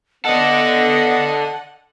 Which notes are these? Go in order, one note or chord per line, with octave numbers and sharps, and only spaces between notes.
B3 A4 D5 D#5 F#5